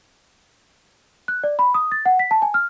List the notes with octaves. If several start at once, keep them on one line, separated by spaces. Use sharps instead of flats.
F#6
D5
B5
D#6
A6
F#5
B6
A5
G#5
F6